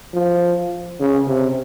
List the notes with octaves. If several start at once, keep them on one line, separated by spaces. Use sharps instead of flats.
F3
C#3
C3